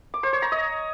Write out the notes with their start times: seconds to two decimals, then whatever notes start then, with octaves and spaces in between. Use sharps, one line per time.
0.14 D6
0.23 C5
0.33 C#5
0.42 A#5
0.52 D#5